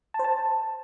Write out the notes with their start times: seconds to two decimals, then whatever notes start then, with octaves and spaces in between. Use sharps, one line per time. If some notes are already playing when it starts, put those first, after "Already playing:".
0.14 A5
0.19 C5
0.24 A5